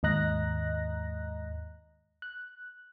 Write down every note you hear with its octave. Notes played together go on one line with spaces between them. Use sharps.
D#2 G#2 D#5 A#5 F#6 A#6
F#6